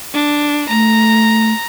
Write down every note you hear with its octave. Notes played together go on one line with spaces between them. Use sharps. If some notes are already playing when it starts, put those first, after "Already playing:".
D4
A3 A#5